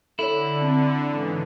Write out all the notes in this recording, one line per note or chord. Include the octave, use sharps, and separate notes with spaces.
D3 E4 A4 C#5
C4
G#2 C#3 E3